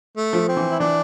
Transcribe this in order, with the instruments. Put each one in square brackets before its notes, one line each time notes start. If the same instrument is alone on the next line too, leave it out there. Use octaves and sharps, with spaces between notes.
[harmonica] A3
[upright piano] F3
[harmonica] C4
[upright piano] E3
[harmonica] E4
[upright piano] E3 [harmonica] D4